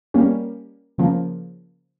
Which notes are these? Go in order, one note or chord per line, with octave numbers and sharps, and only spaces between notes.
G3 A#3 C#4 G4
C#3 F3 A#3